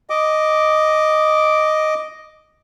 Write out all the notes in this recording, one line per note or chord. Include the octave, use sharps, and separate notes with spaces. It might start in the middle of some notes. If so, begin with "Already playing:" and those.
D#5 D6